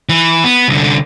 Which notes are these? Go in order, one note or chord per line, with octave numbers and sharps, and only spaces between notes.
E3
B3
C2 D3